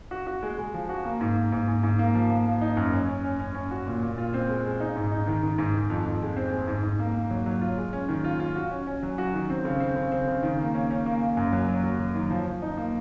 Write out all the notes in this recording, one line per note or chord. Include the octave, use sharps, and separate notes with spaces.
F#4
F#4
G#3
G#3
F3
F#4
A#3
G#2
A#3
G#2
G#2
G#2
A#3
F3
A#3
A#3
D#4
F#2
C#4
C#4
C#4
C#4
C#4
F#4
A#2
A#2
F4
C4
G#3
G#3
D#4
G#2
D#4
D#3
D#3
G#2
D#3
F2
F2
G#3
C4
G#3
G#2
G#2
A#3
A#3
F#3
F#3
F4
G#3
C#4
D#3
F4
F4
F#4
C#4
C#4
F#3
F#4
D#3
C4
C#3
C4
C#3
C4
C#3
D#3
A#3
C#4
C#4
A#3
A#3
F#2
F#3
F#3
F#3
F#3
D#3
F3
F3
D#4
A#3